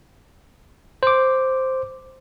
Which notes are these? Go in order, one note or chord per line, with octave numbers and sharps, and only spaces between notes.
C5 D6